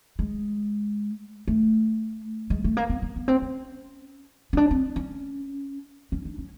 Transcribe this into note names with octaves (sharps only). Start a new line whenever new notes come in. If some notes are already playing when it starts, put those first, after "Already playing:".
G#3
A3
G#3
A3
A#3
B3
A#3
B3
C4
C#4
C#4
D4
C4
C#4
C#4
D4
C#4